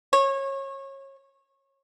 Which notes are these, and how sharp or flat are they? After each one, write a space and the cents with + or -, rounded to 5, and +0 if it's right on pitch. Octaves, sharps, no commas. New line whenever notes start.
C#5 -25